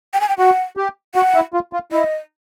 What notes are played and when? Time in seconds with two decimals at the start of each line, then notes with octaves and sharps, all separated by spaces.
0.14 G5
0.21 G#5
0.29 G5
0.38 F#4 F#5
0.77 G4
1.15 F#4 F#5
1.35 E4
1.54 F4
1.73 F4
1.92 E4 D#5